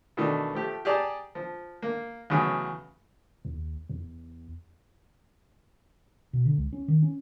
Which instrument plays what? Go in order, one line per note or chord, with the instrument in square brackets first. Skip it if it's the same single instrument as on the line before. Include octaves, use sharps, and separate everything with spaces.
[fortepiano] B2 D#3 E3 A3 D4 D#4
F3 A3 G4
G4 G#4 D5 A5 A#5
F3
A#3
E2 A2 C#3 F#3
[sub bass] D#2
E2
[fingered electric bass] B2
D3
C#2
C#4
D#3
C#4